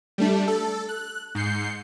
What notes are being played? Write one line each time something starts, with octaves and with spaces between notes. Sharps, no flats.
G3 A3 D4
A4
F#6
G#2 G6 C7 C#7